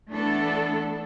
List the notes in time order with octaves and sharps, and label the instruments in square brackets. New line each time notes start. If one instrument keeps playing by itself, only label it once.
[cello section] E3 A3 B3 D4 A4